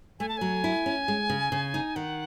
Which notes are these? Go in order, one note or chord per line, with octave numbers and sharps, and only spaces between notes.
A3 G#5
A5
F#3 G#5
E4
C#4
G#3
C#3
C#3
D#4
D#3 F#5